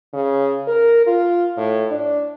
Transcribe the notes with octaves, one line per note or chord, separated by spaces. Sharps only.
C#3
A#4
F4
A2
D4